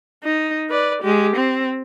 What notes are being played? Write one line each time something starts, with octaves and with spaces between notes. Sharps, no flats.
D#4
B4 D5
G#3 G4
C4